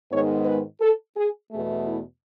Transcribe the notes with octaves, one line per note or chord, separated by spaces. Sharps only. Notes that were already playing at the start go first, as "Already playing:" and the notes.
G#2 D#3 G#3 B3 D#4 C#5
B4
A4
G#4
E2 B2 A3 G#4
E4